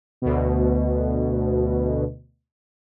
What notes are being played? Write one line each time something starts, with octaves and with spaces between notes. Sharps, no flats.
D2 B2